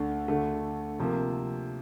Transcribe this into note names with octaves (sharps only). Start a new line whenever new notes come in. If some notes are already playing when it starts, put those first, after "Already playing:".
Already playing: D2 D3 A3 D4
D2 D3 A3
C3 F3 A#3